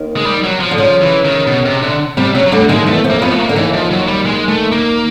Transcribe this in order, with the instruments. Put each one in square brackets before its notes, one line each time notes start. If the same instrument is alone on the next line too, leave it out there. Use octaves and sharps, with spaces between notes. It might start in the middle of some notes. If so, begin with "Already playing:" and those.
Already playing: [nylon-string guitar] D#2 D#3
[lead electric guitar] G#3
G3
F#3
F3
[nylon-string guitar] D3
[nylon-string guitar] C#3 [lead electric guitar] F3
[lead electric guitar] E3
D#3
B2
C3
D3
[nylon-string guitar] C3 [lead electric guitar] G3
[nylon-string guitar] C#3 [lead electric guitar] F#3
[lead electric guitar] F#3
[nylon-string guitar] D2 D3 [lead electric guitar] G3
[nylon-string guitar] D#2 D#3 [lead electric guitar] G#3
[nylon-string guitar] E2 E3 [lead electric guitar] A3
[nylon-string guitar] F2 F3
[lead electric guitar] A#3
[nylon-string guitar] F2 F3 [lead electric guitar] B3
[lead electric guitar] A3
A#3
[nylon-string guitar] D3
[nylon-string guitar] D#2 D#3 [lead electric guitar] E3
[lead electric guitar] F3
F#3
G3
G#3
A3
A#3